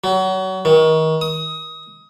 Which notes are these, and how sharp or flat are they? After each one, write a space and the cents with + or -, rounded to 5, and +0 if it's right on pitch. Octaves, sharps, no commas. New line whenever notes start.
F#3 +30
D#3 +30
D#6 +20